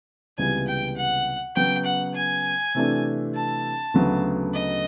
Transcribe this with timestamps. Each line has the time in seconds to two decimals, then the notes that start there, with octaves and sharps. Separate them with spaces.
0.38 C#2 C3 E3 G3 B3 G#5
0.68 G5
0.96 F#5
1.56 C#3 F#3 B3 G5
1.85 F#5
2.15 G#5
2.75 C3 E3 A3 D4
3.35 A5
3.94 D2 C#3 F#3 B3
4.54 D#5